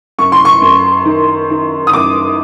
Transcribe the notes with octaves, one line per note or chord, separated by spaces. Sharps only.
F#2 C#6
C6
C#6
F#2
D#3
D#3
D#6
F#2 D6